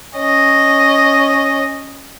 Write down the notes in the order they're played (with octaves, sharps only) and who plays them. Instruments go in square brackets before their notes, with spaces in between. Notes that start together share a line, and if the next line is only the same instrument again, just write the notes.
[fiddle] C#4 D#5